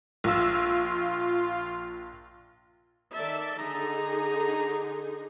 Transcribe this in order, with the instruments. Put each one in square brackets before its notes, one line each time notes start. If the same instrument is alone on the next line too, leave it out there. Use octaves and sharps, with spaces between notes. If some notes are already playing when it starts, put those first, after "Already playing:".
[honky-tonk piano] A#1 E6 [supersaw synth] F4
[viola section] D#3 D5 E5 [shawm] A4
[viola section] D3 D#4 G#4 [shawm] A#5